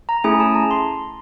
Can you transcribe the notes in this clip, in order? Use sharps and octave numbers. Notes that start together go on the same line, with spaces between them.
A#5
A3 C#4 E4 G#4 G#5
A5
A#5
C6